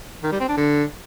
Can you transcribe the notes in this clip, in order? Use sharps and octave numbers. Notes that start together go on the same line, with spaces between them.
D#3
G3
C4
D4
D3